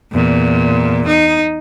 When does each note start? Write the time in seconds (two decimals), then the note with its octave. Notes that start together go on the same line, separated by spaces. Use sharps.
0.12 E2 A#2
1.08 D#4